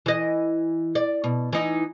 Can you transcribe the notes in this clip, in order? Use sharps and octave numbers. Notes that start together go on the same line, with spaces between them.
E3 D#5
D5
B2
E3 D#4